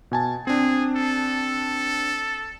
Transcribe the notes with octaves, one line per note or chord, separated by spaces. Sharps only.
B2 G#5 A5
C4 D4 G#4
A4